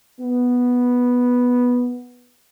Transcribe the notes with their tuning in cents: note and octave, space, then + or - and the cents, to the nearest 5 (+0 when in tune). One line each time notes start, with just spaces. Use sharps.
B3 -5